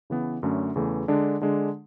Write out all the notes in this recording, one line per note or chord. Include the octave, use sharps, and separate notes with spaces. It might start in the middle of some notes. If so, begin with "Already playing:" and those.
C#3 E3 B3
F#2 D3 A3 C#4
E2 C#3 E3 A3
D3 G#3 D4
D3 G#3 D4